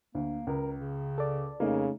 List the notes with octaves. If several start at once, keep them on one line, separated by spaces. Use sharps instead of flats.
D2 A#3
C#2 A#4
C#3
A4 D5
F2 C#3 A3 A#3 D#4